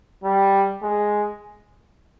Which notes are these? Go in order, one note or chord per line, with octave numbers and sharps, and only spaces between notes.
G3
G#3